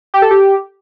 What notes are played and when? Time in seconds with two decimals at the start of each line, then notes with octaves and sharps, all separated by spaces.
0.14 G4
0.22 A4
0.31 G4